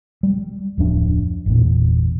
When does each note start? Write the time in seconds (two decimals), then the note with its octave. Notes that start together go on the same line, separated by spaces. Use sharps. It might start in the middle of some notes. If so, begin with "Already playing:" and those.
0.23 G3
0.78 D1 F2 D4
1.46 G1 E2 A#2